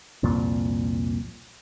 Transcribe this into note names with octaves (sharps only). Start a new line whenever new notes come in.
C2 F2 A#2